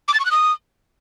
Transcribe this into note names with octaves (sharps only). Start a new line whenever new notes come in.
D6
A6
C#6
F#6
D#6